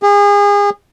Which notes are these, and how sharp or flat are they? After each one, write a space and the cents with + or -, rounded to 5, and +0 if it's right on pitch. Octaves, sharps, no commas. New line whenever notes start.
G#4 -35